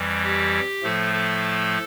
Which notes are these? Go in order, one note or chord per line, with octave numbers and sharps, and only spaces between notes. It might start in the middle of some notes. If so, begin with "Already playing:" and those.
Already playing: F2 E3 G3
G4
A2 F3 A3 A4
A4